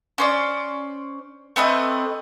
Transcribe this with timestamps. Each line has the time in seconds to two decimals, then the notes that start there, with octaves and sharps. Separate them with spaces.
0.18 C#4 C5 D5
1.56 A3 C4 B4 D#5